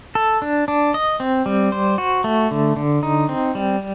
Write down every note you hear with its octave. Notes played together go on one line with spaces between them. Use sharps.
A4
D4
D4
D#5
C4
G3
C5
F#4
A3
D3
D3
D#4
C4
G3